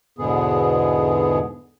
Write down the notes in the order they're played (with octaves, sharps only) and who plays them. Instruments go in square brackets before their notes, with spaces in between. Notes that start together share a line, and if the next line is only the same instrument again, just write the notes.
[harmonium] E2 G#2 B2 D3 B3 G#4